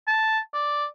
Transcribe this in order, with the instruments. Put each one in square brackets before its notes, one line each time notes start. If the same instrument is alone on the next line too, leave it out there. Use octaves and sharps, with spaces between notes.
[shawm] A5
D5